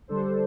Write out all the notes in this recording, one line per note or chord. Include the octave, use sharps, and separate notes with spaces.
D3 G3 D4 A4 C5